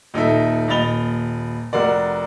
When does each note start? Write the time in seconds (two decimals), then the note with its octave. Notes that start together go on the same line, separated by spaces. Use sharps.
0.14 D#1 D#4 A4 E5
0.68 D#1 D#5 B5 A6 F7 G7
1.73 F1 F#4 A#4 D5